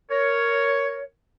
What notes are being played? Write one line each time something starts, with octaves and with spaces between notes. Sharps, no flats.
A#4 C#5